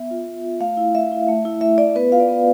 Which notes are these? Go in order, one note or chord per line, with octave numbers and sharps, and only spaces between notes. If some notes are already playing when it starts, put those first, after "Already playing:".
Already playing: B3 E5
F4
B3
F4
A3 F5
E4
A3 E5
E4
A3
E4
A3 E5
E4 D5
B3 B4
F4 F5
D5
B3